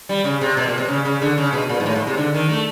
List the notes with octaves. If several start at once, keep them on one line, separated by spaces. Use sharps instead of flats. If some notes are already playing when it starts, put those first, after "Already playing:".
G3
C#3
C3
B2
A#2
C3
C#3
C#3
D3
C#3
B2
A#2
G#2
A2
G#2
C3
D3
D#3
A3